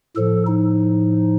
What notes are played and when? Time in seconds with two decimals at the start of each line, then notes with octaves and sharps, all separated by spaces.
0.16 A2 F3 A4
0.47 D#4